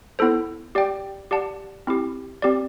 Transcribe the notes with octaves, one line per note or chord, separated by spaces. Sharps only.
B3 E4 A4 C5
G4 D5 G5
G4 D5 F#5 A5
C4 E4 G4
C4 G4 D5